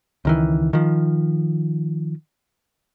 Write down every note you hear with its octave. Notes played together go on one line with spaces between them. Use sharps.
C#2 D#3 E3
D#3 F3